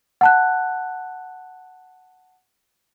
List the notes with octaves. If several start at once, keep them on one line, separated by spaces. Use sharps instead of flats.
F#5 A5 F#6